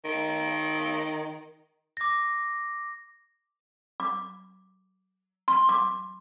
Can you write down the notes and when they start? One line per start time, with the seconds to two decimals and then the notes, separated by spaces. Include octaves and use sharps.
0.05 D#3
1.97 D6 A#6
4.00 D6
5.48 C6
5.69 D6